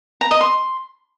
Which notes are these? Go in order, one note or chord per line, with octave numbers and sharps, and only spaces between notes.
A#5
D#5
C6